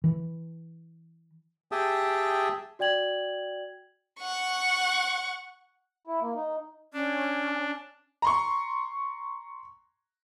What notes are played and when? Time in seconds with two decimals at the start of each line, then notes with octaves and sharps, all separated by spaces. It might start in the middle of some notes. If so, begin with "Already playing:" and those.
0.04 E3
1.72 G4 G#4 E5 G5 A5 D#6
2.79 F#4 D5 G5 G#6 F#7
4.20 F#5 C#6
6.07 E4
6.21 A#3
6.36 D#4
6.94 C#4 D4
8.22 A#5 C6 C#6